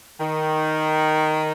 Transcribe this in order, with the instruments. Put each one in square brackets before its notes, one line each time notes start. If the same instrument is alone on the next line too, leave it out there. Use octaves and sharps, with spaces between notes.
[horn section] D#3